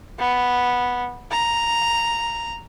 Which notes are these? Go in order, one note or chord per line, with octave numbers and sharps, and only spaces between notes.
B3
A#5